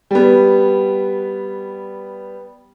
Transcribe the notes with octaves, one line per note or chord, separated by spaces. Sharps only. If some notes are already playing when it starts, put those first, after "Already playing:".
G3 B3